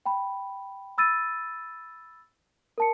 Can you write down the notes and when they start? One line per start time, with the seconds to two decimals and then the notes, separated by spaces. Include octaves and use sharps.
0.06 G5 B5
0.98 B5 E6 A6 D#7
2.78 A#4 A5 C#7